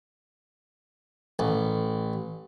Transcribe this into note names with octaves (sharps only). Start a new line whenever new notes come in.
A1